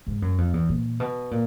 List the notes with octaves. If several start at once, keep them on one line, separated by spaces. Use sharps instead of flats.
G#2
F#2
F2
E2
A#2
B2
A#2